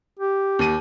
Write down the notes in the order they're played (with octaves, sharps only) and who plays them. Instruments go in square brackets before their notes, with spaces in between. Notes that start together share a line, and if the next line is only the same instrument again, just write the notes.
[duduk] G4
[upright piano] D#2 D#7